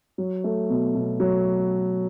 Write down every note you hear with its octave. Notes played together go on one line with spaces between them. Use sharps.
F#3
A3
B2
B2
F#3